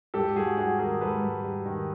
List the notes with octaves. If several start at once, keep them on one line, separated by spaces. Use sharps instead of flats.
G#2 G4 A4
G#2 F#4 G#4
G3 F#4 G#4
D#3 G#4 A#4
G#2 A4 B4
G#2
G3
D#3